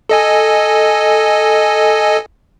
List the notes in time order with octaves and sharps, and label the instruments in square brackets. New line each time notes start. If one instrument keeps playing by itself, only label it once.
[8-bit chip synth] A4 D#5 G#5